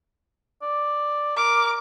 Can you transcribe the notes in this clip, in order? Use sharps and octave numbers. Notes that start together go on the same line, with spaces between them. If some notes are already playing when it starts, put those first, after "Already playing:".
D5
A#4 D6